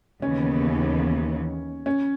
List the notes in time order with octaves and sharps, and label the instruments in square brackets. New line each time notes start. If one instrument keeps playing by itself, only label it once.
[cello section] D#2 C#3 E3 B3 [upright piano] C#4
[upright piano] C#4